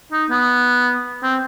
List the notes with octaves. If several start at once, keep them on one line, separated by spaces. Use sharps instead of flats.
D#4
B3
C4